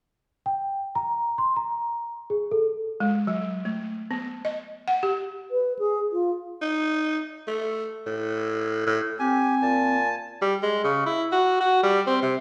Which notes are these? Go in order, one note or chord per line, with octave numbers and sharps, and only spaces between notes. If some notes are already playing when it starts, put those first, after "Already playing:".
G5
A#5
C6
A#5
G#4
A4
G#3
F#3
A3
B3
D#5
F#5
G4
B4
G#4
F4
D#4
A3
A2
A2
C4 G4 G#5
A#2 A5
G3
G#3
C#3
E4
F#4
F#4
G3
C4
C3